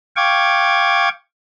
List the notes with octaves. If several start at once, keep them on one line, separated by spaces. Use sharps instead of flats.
F5 G5 C#6 D6 G#6